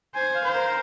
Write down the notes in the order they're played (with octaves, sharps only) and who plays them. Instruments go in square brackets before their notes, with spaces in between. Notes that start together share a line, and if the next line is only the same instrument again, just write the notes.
[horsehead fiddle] C5 [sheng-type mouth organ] G#5
[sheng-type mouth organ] F5
[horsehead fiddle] C5
[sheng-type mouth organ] A#4